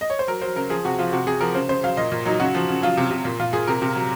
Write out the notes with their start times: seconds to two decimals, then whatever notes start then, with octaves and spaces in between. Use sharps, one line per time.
0.01 D#5
0.10 C#5
0.19 C5
0.27 F#3 A#4
0.42 F#3 C5
0.56 C#3 A#4
0.70 F3 G#4
0.85 C3 F#4
0.99 F3 F4
1.13 C3 F#4
1.27 C3 G#4
1.41 F3 A#4
1.55 C#3 C5
1.69 C#3 C5
1.83 F#3 F5
1.97 A#2 D#5
2.12 A#2
2.25 F#3 D#4
2.40 C#3 F#4
2.55 F3
2.69 C#3
2.82 F#3 F4
2.97 C3
3.11 C3
3.25 A#2
3.39 A#2 F4
3.53 A#2 G#4
3.68 C3 A#4
3.82 C3
3.95 F#3